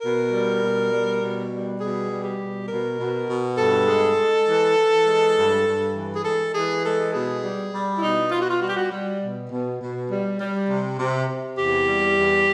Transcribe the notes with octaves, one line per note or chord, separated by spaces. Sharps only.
B2 A#4
G3
B2
G3
B2
G3
B2 G#4
G3
G4
B2
B2 A#4
B2
B2
G2 A4
G#3
G#3
E3
E3
G#3
G2
G2
E3
G#4
G#3 A4
E3 G#4
G#3 A4
B2 G#4
G3
G3
E4
B2 D#4
B2 F4
F#4
F4
G3 F#4
G4
F#4
G3
B2
B2
B2
G3
G3
C3
C3
C3
E2 G4
G3
E2